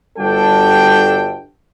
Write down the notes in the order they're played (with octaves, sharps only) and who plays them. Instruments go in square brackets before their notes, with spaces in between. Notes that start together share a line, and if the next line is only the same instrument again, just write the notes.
[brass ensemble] G1 G3 D4 F#4 A4 G5